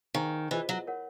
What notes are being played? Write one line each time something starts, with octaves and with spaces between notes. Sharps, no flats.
D#3 G#4 C5 F5 G#5 C#6
E3 F4 G#4 C5 D#5
F#3
A#4 C#5 F#5